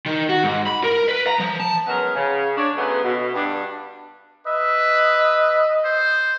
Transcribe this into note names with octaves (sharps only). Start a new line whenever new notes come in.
D#3
F#4
G#2
B5
A#4
B4
A#5
F3
A5
F#3 G#3 B3 C#4 D#4 A#4
C#3
D4 C#5
F#2 C#3 A3 B3
B2
G2 B3 D4
B4 D#5 E5
C5